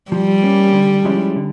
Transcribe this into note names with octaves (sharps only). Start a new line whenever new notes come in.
F3 G3
A#3 C#4
D3
F3 G#3 C#4 E4
D3